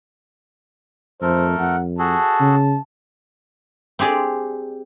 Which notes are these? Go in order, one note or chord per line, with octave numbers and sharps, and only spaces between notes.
F2 A3 A4 A#4 C5
F2 F#5
F#4 G#4 A4 A5
C#3
C4 G4 G#4 D5